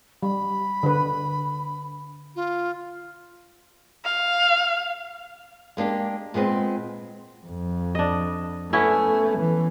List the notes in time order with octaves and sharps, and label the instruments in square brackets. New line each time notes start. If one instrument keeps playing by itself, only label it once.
[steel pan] G3 [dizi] B5
[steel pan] D3 B4
[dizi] F4
[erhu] F5
[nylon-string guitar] G#3 A#3 D4 G4
A#2 G#3 B3 C4
[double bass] F2
[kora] D4 D#5
[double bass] A3 [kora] B3 C#4 E4
[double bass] E3